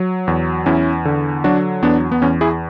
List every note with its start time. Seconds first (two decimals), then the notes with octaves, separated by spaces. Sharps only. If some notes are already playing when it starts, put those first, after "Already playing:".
Already playing: F#3
0.28 E2
0.66 E2 C#4 E4
1.05 D3
1.44 F#3 D4 F#4
1.83 E2 B3 D4
2.12 B3
2.22 E2 C#4
2.41 E4 G#4